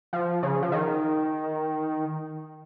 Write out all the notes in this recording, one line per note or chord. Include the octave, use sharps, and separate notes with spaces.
F3
C#3
F3
D#3